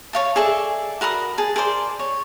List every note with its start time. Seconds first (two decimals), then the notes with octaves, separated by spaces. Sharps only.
0.13 C#5 F5 A5
0.36 G#4 A4 D5 E5
1.01 F#4 A#4 B5 D#6
1.38 G#4 A5
1.56 G#4 A#4 C5 D5
1.99 C#5